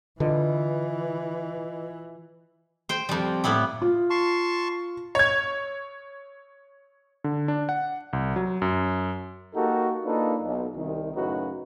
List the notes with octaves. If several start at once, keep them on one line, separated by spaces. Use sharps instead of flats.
D3 E3 F4 B4 D#5
C5 G5
F2 G3
A2 B3 E4 G4
F4
A5 C6 C#6
C#5 G#6
D3
D4
F#5
C2
F#3
F#2
A#3 D#4 F#4 G4 A4 A#4
A#3 D4 D#4 F4 A4 B4
B1
C2 D#3
F#2 A2 C#3 D#4 F#4 B4